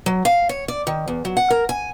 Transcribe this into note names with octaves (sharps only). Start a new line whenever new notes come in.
F#3
F5
C#5
D5
D#3
E2
F#3
F#5
A#4
G#5